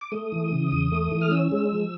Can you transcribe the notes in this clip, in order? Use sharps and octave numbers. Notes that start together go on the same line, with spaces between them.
D6
A3 D#6
E3
C#3
E2
A3
E3
F6
C#4 E6
G#3
F3